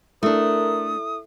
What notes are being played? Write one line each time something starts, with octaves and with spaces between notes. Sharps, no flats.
A3 D4 E4 A4 A#4 E5 D#6